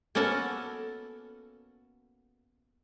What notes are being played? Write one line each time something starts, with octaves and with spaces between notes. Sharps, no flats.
A#3 B3 C#4 F#4 A4